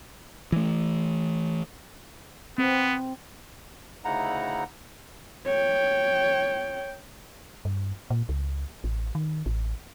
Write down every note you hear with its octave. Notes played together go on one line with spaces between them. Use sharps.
E3 A3
B3 C4
D2 C#3 D#4 E4 F#5 A#5
C#5 G5
G2
A#2
C#2
A1
D#3
A1